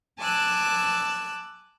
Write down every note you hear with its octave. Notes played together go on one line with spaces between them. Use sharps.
G#5 A5 D6 E6 F#6